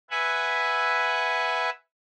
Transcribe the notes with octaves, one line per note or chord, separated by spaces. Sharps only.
B4 E5 F#5 G#5